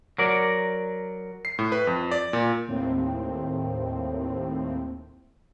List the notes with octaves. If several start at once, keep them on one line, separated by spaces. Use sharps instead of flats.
F#3 A#4 D5
C7
A2
B4
F2
D5
A#2
D#2 A2 C4